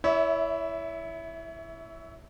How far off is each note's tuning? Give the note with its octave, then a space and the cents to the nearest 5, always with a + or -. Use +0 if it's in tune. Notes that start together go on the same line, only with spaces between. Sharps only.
E4 +0 C#5 +30 E5 -25